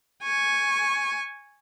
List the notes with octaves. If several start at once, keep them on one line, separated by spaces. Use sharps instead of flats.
G#5 C#6